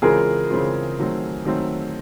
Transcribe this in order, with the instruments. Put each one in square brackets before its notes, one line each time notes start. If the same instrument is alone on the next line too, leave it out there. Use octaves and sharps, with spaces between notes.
[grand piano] C#3 E3 G#3 C4 F4 [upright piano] G#4 A#4
[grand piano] C#3 E3 G#3 C4 F4
D#3 F#3 A3 C4
D#3 F#3 A3 C4